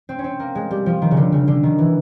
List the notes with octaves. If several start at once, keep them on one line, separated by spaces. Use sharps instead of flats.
C4
C#4
C4
A#3
G#3
G3
F3
D#3
C#3
D3
C#3
D3
D#3
E3